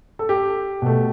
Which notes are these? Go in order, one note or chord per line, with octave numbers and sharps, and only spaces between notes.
A4
G4
B2 A3